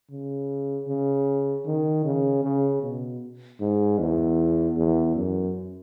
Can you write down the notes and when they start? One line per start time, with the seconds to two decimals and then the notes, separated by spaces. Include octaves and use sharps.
0.10 C#3
0.88 C#3
1.66 D#3
2.05 C#3
2.44 C#3
2.82 B2
3.61 G#2
3.99 E2
4.77 E2
5.16 F#2